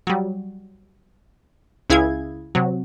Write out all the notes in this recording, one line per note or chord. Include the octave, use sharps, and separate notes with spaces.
F#3 G3
C#2 E4 G#4 F5 G#6
C3 F#3